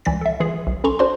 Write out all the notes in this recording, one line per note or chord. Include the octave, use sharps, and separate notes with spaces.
C#2 E3 D5 A6 B6
A4 E5
E3 F4 G#4
B1
C#4 A4 G#5 A#5 C6 C#6
D4 F#4 C5 D5 A5 C6